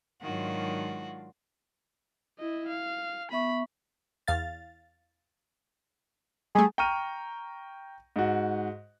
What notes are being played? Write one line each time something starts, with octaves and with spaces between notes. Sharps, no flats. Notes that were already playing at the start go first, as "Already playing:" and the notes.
G#2 D#3 F#3 D4 F4 F#4
E4 D#5
F5
B3 E5 B5 C#6
E2 F5 A6
G3 A3 G#4
G5 A#5 C#6 F6 D#7
G#2 F#4